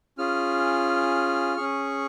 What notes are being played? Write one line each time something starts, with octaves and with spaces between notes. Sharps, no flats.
C#4 F4 G#4 F6
C#4 G#4 C#6